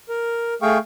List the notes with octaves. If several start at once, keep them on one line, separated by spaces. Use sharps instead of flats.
A#4
A3 G#4 F5 G5 C#6